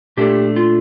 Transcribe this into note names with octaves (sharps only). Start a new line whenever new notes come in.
A#2 A3 D4 G4
F4